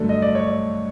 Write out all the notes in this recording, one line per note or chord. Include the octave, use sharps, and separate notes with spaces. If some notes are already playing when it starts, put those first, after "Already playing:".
Already playing: G2 D3 F#3 A3
D#5
D5
C#5
D5